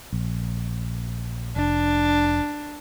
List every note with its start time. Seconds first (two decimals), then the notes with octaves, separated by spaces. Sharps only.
0.12 A#1
1.56 F1 D4